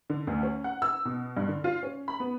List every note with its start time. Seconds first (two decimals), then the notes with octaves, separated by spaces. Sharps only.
0.10 D3
0.27 D2
0.43 C#4
0.64 F#5
0.82 E6
1.05 B2
1.37 G2
1.48 D3
1.64 F4
1.83 C#4
2.08 B5
2.20 B3